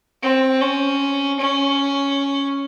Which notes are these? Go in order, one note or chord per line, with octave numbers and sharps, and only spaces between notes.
C4
C#4
C#4